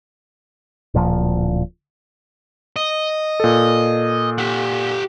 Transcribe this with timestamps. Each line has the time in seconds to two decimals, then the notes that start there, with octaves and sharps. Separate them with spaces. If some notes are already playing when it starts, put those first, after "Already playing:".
0.94 D1 A#2 F3
2.76 D#5
3.40 A#2 A4
4.38 G4 F#5